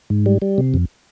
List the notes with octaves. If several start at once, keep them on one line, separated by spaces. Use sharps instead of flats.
G#2
G3
G3
C3
F2